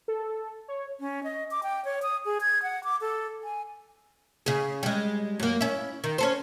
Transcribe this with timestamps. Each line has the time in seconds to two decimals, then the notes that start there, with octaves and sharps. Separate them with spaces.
0.08 A4
0.68 C#5
1.00 C#4
1.24 D#5
1.51 D6
1.63 G5
1.85 C#5
2.02 D#6
2.25 G#4
2.41 G#6
2.63 F#5
2.84 D6
3.01 A4
3.44 G#5
4.46 C#3 G#4
4.83 G3 G#3
5.40 F#2 A#3
5.61 C#4 E4
6.04 D#3
6.18 C#4 A4 C5